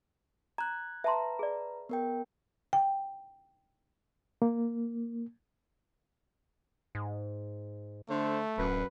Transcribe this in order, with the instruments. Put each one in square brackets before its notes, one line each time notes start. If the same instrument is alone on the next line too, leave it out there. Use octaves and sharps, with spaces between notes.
[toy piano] A#5 [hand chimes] F#6 G#6
[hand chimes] B4 A#5 [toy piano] E5 A5 C6
[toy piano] G#4 D5
[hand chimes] B3 A#4 G5
[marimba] G5
[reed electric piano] A#3
[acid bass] G#2
[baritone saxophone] D3 [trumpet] A3 [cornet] C5
[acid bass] D1 [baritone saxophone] F#2 [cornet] B4